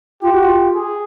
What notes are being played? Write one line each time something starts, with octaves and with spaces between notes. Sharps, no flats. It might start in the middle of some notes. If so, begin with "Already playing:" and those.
F4 G4
F#4
F4
G#4